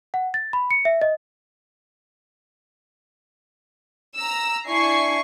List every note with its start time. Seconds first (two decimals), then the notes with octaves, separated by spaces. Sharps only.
0.14 F#5
0.34 A6
0.53 B5
0.71 C#7
0.85 E5
1.02 D#5
4.15 A#5 E6
4.66 D4 E4 G#5 C#6 C7